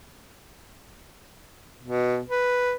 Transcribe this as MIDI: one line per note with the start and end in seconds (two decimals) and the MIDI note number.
1.83 2.22 47
2.29 2.75 71